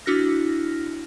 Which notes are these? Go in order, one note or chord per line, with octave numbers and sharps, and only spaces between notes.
D4 E4 F#4 F6 A#6